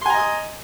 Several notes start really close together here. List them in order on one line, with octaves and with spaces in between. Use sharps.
C6 G#5 A#5 D#5 D#6